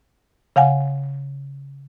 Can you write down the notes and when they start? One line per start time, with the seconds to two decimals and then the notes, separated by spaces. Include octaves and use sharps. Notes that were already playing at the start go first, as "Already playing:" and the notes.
0.56 C#3 F5 F#5 G#5